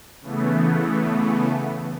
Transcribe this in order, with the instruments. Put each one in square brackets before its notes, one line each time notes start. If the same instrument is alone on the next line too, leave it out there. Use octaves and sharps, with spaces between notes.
[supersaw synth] C#3 E3 A3 B3